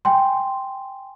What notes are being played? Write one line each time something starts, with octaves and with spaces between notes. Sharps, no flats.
G5 G#5 C6